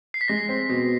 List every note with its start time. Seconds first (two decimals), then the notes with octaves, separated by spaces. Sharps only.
0.14 C7
0.21 B6
0.28 G#3 A#6
0.49 C4
0.69 B2